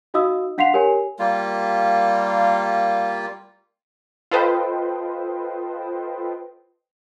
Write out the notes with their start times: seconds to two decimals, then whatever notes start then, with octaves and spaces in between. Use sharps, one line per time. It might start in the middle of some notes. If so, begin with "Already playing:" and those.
0.14 D#4 F#4 D#5 F5 D#6 E6
0.58 D4 F5 F#5 C6 C7 F7
0.74 G4 A#4 C#5 G#5
1.19 G3 A#3 F4
4.31 F4 A4 B4 C5 D#5 G5